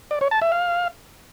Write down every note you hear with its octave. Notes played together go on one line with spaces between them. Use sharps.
D5
C#5
A5
E5
F5